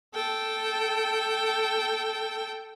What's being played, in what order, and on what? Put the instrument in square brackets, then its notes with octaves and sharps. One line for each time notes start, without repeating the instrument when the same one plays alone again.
[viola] A4 G5